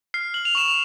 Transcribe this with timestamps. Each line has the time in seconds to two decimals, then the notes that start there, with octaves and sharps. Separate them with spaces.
0.14 F6 C7
0.34 F6 F#7
0.45 F7
0.55 C#6 E7
0.68 F7